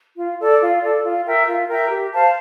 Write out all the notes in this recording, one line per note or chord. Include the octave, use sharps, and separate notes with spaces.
F4
A4 D5
F4
A4 D5
F4
A#4 E5 G5
F4
A#4 E5 G5
G4
C5 F5 A5